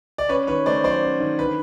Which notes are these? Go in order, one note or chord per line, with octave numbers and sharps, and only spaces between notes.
D5
C#4 B4 C#5
D#3 B4 C#5
A3 C5 D5
F#3 C5 D5
C#4
D#3
D3 B4